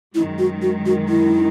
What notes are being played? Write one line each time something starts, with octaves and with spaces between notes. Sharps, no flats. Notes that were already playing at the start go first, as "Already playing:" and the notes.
F#2 D#3 G#3 E4
F#4
F#4
F#4
E4